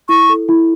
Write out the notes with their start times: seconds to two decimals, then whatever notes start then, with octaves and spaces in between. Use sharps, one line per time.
0.09 E4 C#6
0.29 A4
0.49 E4